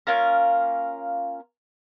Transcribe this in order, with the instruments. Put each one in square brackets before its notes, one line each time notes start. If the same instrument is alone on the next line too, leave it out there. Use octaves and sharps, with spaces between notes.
[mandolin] A#3 C#4 F4 A#4